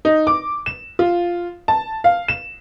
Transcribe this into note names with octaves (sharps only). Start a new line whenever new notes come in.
D#4
D6
E7
F4
A5
F5
E7